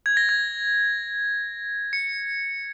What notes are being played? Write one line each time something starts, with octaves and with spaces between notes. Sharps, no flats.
G#6
A#6
G#6
C#7